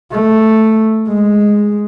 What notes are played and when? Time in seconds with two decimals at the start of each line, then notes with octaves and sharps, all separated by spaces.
0.12 A3
1.08 G#3